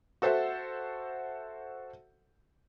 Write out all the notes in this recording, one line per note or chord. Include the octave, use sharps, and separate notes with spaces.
F#4 A4 C5 E5 F#5